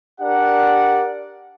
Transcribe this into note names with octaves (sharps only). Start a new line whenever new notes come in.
D4 G4 A#4 D5 F#5